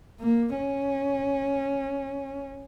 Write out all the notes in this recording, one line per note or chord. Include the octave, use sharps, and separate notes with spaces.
A#3
C#4